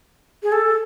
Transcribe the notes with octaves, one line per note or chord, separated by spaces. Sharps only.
G#4
A4